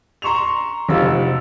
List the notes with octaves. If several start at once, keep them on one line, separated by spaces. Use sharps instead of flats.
A#5 C6 C#6 E7 F7
F1 F3 F#4 F5 E6